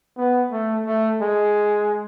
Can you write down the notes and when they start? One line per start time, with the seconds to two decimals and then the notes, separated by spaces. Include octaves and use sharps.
0.18 B3
0.52 A3
0.86 A3
1.21 G#3